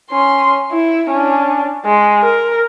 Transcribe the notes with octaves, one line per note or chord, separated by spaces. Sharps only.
C#4 C6
E4
C#4 D4
G#3
A#4